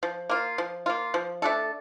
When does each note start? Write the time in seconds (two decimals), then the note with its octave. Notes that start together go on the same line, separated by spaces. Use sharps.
0.03 F3
0.29 A#3 F4
0.58 F3
0.86 A#3 F4
1.14 F3
1.42 A3 D4 A4